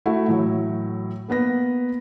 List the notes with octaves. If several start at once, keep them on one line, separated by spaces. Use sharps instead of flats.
A3 E4 F#4
A2 E3 F#3
A#3 B3 B4 A#6